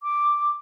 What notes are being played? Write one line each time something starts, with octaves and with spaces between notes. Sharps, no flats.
D6